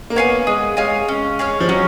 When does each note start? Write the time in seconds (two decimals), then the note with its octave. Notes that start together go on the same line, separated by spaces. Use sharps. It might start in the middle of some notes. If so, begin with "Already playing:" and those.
0.10 A#3
0.16 B3 C#5 F5 G#5
0.47 G#3 G#4
0.77 G#3 C#5 F5 G#5
1.08 C#4
1.39 G#4 C#5 F5
1.60 F3
1.69 F#3 C#4